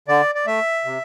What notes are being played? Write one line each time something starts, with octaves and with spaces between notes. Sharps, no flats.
D3 D5
D5
A3 E5
C3